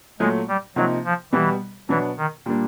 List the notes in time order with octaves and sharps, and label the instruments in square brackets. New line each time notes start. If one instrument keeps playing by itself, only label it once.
[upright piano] A#2 F#3 A3 [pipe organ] G#3
[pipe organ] G3
[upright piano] C3 F3 A#3 D#4 [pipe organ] F#3
[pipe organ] F3
[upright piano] B2 G3 B3 [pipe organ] E3
[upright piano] B2 F#3 B3 D4 [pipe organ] E3
[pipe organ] D#3
[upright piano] A#2 G3 A#3 D4